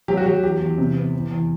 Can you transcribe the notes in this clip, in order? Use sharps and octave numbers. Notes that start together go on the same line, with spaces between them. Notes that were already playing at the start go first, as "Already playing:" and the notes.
F#3 G4
F#4
F#3 G4
E2 G4
E2
C3
B3
E2
E2